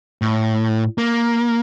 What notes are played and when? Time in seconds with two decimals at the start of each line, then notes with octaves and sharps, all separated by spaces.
0.22 A2
0.98 A#3